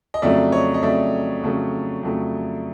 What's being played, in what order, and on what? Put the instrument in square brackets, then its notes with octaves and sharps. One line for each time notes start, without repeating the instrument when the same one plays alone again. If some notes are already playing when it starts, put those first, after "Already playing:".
[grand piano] D#5
F2 C#3 F#3 A3 D5 E5
C#5 D#5
D#5
F2 C#3 F#3 A3 D5 E5
F2 C#3 F#3 A3
F2 C#3 F#3 A3